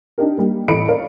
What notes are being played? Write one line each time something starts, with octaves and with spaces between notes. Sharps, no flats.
D4 D#4 G4 A#4
G3 A#3
A1 A4 D#5 B5 C#7 D7
A#4 C#5 D5 F5